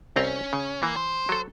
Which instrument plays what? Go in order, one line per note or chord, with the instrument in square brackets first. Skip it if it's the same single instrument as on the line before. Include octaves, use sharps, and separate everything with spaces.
[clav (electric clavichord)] C2 C4 A#5 [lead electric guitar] C#4
[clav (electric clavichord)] C#3
[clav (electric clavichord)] E3 [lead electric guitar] A#3
[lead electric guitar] C5
[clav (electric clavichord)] F#3 A4